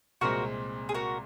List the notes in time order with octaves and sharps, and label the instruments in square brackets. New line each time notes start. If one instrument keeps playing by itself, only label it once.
[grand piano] C2 A#2 G#3 C4 [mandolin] F#4 A#4
[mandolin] G#4
F#4 A#4